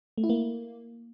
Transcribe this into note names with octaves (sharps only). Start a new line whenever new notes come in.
A3
E4
A#3